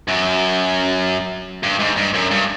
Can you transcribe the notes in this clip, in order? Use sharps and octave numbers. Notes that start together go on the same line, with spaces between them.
F#2
G2
G#2
G2
F#2
G2